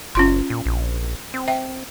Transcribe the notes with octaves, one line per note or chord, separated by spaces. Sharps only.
F#1 C#4 F4 C6
A#2
A#1
C4
E5 G5